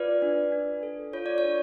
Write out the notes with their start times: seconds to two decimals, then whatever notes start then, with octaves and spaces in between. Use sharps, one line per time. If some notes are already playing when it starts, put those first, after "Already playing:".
Already playing: F4 B4 D5
0.22 D4
0.52 D4
0.83 A4
1.13 F4 C#5
1.26 D5
1.38 C#5
1.44 D4